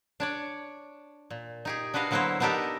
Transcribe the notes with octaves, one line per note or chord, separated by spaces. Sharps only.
D4 C#5 D5
A#2
D#4 G4 G#4
D4 F#4 B4 D#5 F5
D3 F#3 A#3 B3 E4 C5
B3 D4 D#4 G4 A4 A#4